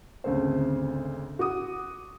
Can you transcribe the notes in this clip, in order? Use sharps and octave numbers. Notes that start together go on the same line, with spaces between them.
G#1 D2 C#3 A3 A4 C5
F#4 D6 D#6